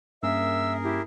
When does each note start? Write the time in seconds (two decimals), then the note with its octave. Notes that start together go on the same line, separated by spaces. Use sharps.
0.23 G2 A#3 C#4 G#4 A#4 E5 E6
0.83 E4 G4